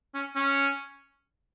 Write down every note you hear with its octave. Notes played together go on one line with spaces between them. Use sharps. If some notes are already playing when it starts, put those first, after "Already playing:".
C#4
C#4